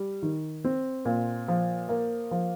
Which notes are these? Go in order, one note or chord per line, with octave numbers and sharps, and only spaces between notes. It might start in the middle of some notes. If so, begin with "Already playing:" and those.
Already playing: G3
D#3
C4
A#2
F3
A#3
F3